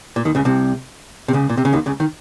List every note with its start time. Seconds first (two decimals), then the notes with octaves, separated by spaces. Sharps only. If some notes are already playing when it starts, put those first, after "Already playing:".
0.16 A#2
0.25 D#2 D#3
0.35 C#2 C#3
0.45 C2 C3
1.28 C3
1.33 C#2 C#3
1.49 A#2
1.57 C3
1.65 C#3
1.73 D#2 D#3
1.86 C#2 C#3
2.00 D#3